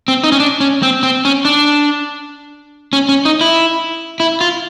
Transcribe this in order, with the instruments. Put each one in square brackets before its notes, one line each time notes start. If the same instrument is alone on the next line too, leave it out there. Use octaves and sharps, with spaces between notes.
[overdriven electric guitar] C4
D#4
C#4
D4
C#4
C4
C4
C#4
D4
C#4
C#4
D#4
E4
E4
F4